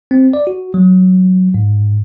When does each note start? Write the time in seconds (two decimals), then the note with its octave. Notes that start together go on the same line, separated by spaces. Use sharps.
0.11 C4
0.33 D5
0.47 F#4
0.74 F#3
1.54 G#2